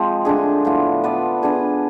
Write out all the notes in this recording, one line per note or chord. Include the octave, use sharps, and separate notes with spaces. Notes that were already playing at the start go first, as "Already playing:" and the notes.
Already playing: F3 G#3 C4
D3 A3 D4 G#4
A2 F3 B3
B3 F4 B4 D5
B3 D4 G#4